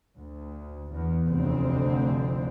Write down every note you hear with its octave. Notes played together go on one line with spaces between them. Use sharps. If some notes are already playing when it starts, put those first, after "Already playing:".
D2
E2
F1 D2 D3 C4